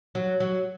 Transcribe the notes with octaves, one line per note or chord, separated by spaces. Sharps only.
F#3
F#3